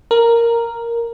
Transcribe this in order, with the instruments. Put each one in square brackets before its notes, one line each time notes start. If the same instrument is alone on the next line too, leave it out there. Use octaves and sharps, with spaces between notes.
[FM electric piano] A#4